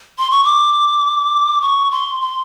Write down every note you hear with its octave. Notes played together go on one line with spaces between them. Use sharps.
C6
C#6
D6
C#6
C6
C6